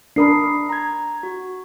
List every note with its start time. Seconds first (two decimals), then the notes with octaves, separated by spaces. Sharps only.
0.16 D4 A#4 B5 D#6 C7
0.69 A#5 G#6
1.23 F#4